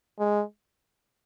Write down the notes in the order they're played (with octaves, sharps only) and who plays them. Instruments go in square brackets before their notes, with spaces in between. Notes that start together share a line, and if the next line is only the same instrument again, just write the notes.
[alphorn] G#3